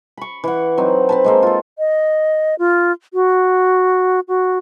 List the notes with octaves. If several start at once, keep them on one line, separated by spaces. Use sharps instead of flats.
B5 C#6
E3 F#5
F#3 C4 D#4
C4 B4 A5
G#3 A#3 C4
F4 A4
D#5
F4
F#4
F#4